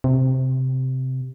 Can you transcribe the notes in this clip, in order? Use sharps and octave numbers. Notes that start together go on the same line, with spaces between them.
C3